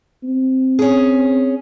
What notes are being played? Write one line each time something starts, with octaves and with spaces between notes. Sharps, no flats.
C4
C#4 G#4